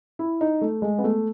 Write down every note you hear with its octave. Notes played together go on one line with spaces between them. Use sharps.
E4
D#4
A3
G#3
B3
A3